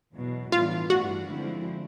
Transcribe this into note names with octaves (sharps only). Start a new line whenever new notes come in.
E2 B2 F#3
A2 E3 G3 B3 D4 F4
G2 E3 A3 D4 F#4
D3 F3 G#3 C4 E4